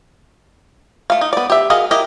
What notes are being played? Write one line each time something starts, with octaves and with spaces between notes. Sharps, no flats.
A3 F5
D#4
B3 D5
G4 E5
F#4 G#4 A#4 D#5 F5
E4 G4 A#4 D#5